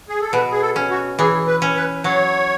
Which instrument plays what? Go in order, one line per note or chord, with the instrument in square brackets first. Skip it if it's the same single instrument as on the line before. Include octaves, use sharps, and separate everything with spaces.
[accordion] G#4
A4
[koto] B2 [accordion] B4
[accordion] G#4
A4
[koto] C#4
[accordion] F#4
[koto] E3 [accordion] G#4
[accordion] B4
[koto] C#4
[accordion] B4
[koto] F#3 [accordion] C#5